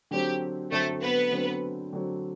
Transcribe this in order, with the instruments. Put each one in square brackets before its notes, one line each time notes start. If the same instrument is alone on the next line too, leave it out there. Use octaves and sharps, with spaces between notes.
[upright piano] D3 F#3 C4 [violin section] G4
[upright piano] D3 F#3 C4 [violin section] A3 A4
[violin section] B3 B4
[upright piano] D3 F#3 C4
D3 F#3 C4